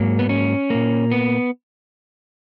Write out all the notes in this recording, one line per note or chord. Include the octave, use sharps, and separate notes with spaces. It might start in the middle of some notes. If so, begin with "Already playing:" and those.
Already playing: G#2 F#3 A#3
B3
C#4
A#2 A#3
B3